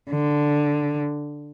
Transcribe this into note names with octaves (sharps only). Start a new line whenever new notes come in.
D3